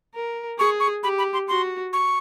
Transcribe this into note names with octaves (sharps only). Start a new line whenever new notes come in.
A#4
G#4 C#6
C#6
G4 B5
B5
C6
F#4 C6
C#6